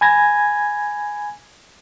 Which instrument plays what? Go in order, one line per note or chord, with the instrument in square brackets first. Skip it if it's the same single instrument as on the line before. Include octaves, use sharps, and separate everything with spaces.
[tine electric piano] G#5 B5 G#6 A#6